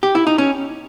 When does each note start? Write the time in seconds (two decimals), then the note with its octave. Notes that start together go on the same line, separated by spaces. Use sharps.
0.03 G4
0.15 E4
0.27 D#4
0.38 C#4